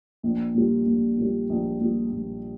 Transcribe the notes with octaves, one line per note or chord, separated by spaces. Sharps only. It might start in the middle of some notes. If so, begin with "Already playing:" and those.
A#1
A#2 G3
A#1
A#2 G3
A#1
A#2 G3
A#1